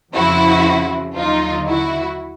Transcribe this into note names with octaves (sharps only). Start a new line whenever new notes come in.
F2 C#3 F3 E4 F#4
D#2 D3 F#3 D#4 F4
E4 F#4